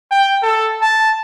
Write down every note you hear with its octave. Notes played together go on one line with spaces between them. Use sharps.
G5
A4
A5